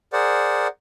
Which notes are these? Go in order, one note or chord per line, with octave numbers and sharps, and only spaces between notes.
G#4 A#4 C5 D5 F#5